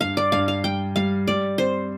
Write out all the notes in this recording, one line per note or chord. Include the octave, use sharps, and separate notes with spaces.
G2 F5
D5
G2 F5
F5
G3 G5
G3 F5
G3 D5
C4 C5